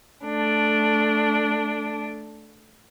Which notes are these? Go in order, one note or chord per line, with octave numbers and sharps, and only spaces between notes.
A3 D4